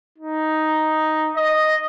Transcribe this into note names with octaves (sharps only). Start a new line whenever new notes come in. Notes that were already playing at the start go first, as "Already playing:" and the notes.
D#4
D#5